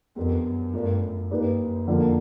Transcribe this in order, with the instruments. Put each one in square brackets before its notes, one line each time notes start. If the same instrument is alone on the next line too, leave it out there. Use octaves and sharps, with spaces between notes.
[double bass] F2 [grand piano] B3 D4 G4 A#4
[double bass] F#2
[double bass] G2 [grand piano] A3 D4 F4 A#4 D5
[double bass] F#2
[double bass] G2 [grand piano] A#3 D#4 G4 B4 D5
[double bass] F#2
[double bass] F2 [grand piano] D3 F3 A#3